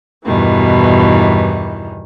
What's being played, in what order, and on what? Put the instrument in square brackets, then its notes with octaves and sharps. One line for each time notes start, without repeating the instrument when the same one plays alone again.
[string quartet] E2 G2 B2 D#3 E3